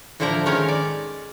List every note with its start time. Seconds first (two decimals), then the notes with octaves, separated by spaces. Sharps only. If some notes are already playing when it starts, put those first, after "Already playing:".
0.20 A2 D3 F3 E4 A#4 A#5
0.46 D#3 G#3 C#4 A#4 C#5
0.68 D5